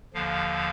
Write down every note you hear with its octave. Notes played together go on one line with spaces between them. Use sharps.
D#2 D3 F3 F5